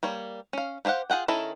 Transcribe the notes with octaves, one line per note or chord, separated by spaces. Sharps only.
G3 A#3 C#5
C#4 F5
B3 G4 C5 F5 F#5
F4 G#4 F#5 G5
D#3 C#4 E4 A4 A#4